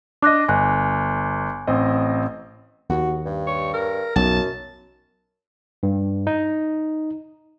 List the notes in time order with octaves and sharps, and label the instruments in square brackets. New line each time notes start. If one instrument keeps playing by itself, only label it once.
[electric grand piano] D4 D#5 [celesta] D6 F#6 A#6
[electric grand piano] G1 [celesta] G#5 F#6
[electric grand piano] A1 C4 D#5
[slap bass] D#2 [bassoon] F#4
[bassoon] G2
[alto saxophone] C#5
A#4
[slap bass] B1 [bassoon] F#2 [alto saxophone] A5
[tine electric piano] G2
D#4